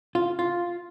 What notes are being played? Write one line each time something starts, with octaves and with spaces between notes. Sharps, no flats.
F4
F4